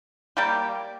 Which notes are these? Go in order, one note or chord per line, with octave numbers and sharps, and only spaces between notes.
G3 A#3 G4